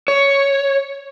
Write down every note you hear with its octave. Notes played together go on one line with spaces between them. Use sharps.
C#5